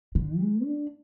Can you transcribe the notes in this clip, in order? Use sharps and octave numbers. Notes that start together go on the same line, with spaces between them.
D3
G#3
D4